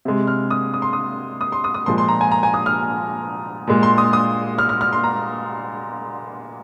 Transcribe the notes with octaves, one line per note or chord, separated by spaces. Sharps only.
C3 G#3
F6
D#6
D#6
C6
D#6
D#6
C6
D#6
D#6
A#2 F3 G#3 C6
C6
A#5
G#5
A#5
G#5
D#6
F6
A#2 G#3
C6
D#6
D#6
F6
F6
F6
C6
A#5